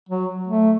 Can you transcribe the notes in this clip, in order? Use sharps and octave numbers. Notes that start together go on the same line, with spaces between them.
F#3
A3